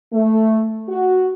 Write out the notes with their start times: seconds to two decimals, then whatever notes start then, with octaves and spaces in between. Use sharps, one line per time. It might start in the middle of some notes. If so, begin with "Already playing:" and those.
0.13 A3
0.89 F#4